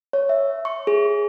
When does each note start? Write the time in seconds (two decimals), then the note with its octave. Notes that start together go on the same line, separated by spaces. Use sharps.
0.13 C#5
0.29 E5
0.65 C#6
0.87 G#4